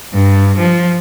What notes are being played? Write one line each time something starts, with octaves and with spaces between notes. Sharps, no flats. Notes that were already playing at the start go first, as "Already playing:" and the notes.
G2
F3